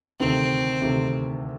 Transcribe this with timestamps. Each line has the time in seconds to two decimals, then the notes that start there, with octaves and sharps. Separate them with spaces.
0.20 D2 C3 D#3 C4
0.82 D2 C3 D#3